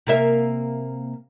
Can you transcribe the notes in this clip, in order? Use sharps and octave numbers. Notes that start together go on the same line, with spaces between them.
C3 A#3 E5